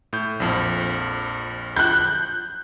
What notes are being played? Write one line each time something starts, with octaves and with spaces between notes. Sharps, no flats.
A2 G6
A#1 F2 F3
F#6 G6